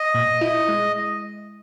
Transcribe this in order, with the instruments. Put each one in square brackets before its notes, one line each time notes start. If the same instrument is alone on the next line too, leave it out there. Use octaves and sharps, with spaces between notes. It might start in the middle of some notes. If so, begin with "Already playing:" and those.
Already playing: [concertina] D#5
[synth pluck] A#2
E4
G#3